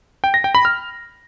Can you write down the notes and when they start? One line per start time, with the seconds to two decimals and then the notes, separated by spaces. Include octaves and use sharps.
0.24 G5
0.34 A#6
0.44 G5
0.55 B5
0.65 F6